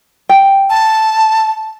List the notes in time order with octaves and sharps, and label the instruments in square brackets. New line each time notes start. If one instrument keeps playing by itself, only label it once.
[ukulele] G5
[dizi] A5